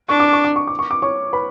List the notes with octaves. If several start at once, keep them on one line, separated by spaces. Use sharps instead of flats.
D4 C#6
D6
C#6
D6
C#6
D6
C#6
D6
C#5 C#6
B4 B5